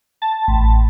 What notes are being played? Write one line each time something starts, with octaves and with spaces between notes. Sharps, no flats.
A5
A1